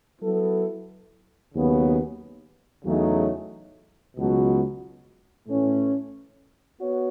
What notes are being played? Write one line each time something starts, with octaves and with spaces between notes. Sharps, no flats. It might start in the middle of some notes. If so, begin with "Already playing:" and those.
F#3 B3 E4 A4
D#2 C#3 F#3 B3
E2 C#3 F#3 A3 D#4
C#2 B2 F#3 B3 F#4
A2 E3 A3 C#4
B3 F#4 C#5